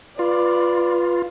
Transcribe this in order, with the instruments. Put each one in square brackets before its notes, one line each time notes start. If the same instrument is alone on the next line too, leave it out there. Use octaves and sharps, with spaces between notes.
[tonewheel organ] F4 [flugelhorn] B4 [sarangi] D5